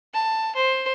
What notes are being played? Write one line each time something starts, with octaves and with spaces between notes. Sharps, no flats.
A5
C5